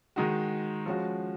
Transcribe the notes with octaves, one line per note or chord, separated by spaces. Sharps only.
D#3 G#3 D#4 F#4
F3 G#3 C#4 F#4